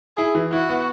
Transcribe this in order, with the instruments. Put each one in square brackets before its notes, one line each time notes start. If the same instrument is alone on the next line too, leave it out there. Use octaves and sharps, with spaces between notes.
[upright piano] E4 [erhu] G#4
[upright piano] E3
[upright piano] E4 [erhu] F#4
[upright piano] B3